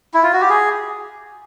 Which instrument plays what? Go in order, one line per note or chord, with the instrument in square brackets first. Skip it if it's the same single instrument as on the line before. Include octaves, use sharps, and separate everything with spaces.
[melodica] E4
F4
F#4
G4
G#4